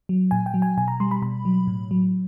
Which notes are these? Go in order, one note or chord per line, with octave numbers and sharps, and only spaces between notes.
F#3
A#2 G#5
G5
F#3
G#5
B2 G#5
A#5
G3 C6
B5
B2 B5
F#3
A2
F#3